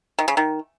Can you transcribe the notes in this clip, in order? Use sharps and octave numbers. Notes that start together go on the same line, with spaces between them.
D#3
C#3
D#3